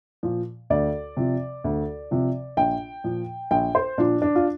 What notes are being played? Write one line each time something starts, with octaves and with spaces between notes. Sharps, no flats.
A#2 F3
D2 D5
C3 F3
D2
C3 F3
A#1 G5
A#2 F3
A#1 G5
C5
A#2 F3 D4
D4
F4